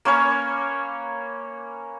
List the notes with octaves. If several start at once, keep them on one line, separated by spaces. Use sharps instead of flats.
A#3 C#4 B4 C#5